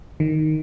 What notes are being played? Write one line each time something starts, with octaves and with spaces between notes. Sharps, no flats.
D#3